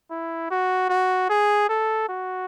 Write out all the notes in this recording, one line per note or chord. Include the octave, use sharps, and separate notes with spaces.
E4
F#4
F#4
G#4
A4
F#4